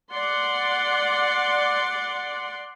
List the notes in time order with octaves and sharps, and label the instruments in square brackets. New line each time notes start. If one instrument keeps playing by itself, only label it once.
[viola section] D5 F#5 C6